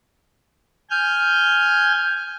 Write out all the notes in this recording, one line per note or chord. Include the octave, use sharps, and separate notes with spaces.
G#5 F6 G6